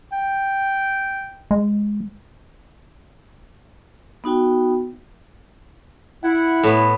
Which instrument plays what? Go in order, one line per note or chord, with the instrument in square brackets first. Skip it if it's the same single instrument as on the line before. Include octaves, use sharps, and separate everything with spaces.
[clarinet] G5
[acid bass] G#3
[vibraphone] B3 D#4 F#4 G5
[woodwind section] E4 [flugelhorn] F#5
[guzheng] A2 B3